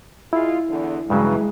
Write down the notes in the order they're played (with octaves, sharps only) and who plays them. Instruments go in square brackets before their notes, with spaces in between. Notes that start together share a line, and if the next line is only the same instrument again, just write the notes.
[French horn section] G#3 F4 [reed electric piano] E4
[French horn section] E2 D3
[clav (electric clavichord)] G2 C#3 F#3 [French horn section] E3 [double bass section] G#3